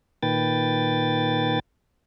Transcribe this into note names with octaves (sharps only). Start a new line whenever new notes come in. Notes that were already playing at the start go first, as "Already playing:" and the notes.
A#2 D#3 B4 G5 A6